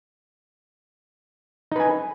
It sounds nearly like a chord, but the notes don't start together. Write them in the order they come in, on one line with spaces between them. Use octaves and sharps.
D#4 B4 G#5